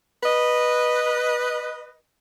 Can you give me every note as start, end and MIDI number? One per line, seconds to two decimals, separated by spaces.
0.24 1.97 71
0.24 1.97 75